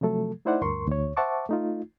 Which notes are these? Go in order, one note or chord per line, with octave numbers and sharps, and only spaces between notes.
C3 F3 F#3 A3 A4
A3 D#4 E4 C5 D5 F#5
D2 G2 A#4 C6 C#6
D2 C#5
C5 E5 F#5 A5 C#6 D6
A3 D#4 F4